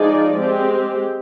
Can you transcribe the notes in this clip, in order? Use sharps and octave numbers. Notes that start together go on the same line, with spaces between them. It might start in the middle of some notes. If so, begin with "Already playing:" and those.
Already playing: F3 G#3 D#4 G#4 D5
G#3 C4 G4